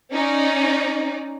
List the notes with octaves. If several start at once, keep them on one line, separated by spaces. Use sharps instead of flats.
C#4 D#4 D5